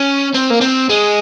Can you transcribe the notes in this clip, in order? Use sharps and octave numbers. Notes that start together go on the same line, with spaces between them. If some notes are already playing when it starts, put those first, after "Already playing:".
Already playing: C#4
C4
A#3
C4
G#3